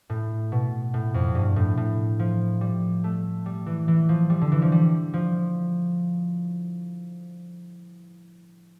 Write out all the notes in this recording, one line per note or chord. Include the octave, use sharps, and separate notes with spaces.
A2
B2
A2
F2
G2
A2
A2
F3
G3
A3
G3
E3
E3
F3
G3
D3
E3
F3
G3
F3